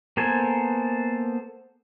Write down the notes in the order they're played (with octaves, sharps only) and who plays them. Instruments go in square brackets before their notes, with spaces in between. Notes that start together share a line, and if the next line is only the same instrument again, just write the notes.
[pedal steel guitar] A#3 B3 A4 C5 G#5